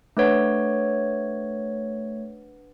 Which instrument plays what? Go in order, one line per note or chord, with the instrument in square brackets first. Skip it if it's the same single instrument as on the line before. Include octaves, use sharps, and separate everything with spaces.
[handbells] A3 C#5 [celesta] D4 B4 F#5